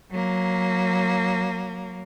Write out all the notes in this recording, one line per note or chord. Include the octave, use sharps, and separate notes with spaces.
F#3 A#3